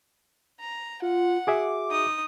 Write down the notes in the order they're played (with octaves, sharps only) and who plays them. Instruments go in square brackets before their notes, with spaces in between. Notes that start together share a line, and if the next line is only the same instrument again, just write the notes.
[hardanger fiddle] A#5
[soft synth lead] F4 [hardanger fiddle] F#5
[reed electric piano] F#4 G#4 E5 [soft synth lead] D6
[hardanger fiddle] D#4 D#6